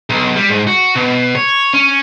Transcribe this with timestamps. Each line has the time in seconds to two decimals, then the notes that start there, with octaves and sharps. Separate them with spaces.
0.10 B1
0.36 G3
0.49 G#2
0.67 F#4
0.96 B2
1.35 C#5
1.74 C#4